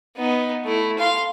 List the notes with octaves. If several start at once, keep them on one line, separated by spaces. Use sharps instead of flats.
B3 D#4
A3 E4
F5 C6